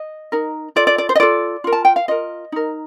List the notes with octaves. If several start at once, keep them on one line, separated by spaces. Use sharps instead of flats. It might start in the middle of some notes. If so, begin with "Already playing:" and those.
Already playing: D#5
D#4 A#4
F4 A4 D5
D5
D5
C5
D#5
F4 A4 D5
F4 A#4
A5
G5
F5
F4 A#4 D#5
D#4 A#4